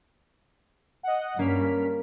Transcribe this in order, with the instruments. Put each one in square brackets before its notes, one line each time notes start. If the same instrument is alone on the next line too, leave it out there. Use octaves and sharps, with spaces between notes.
[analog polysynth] D#5 F#5
[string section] G2 [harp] A#3 [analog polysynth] C#4 F6 B6